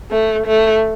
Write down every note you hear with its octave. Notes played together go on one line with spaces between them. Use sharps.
A3
A3